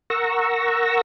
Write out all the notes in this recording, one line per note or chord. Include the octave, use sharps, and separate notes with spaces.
A#4 F#5 C#6 E6 A#6